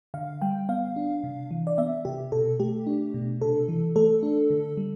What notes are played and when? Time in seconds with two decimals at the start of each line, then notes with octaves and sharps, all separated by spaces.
0.14 D3 F5
0.42 G3 G5
0.69 B3 F5
0.96 D4
1.24 C3
1.51 E3
1.67 D5
1.78 B3 E5
2.05 C3 G4
2.32 B2 A4
2.60 A3 G4
2.87 D4
3.14 B2
3.41 C3 A4
3.69 E3
3.96 A3 A4
4.23 D4
4.50 D3
4.77 G3